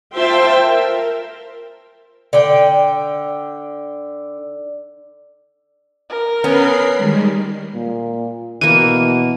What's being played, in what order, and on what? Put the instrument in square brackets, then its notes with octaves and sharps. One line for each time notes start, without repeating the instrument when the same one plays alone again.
[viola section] F4 C5 E5 G5 A5 C6
A#4
[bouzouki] D3 G5
[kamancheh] A#4
[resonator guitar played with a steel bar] B3 C#4 [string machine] B5 C7
[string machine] D#3 G3 G#3
[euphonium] A#2
[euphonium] B2 [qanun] E3 A#3 [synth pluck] D#7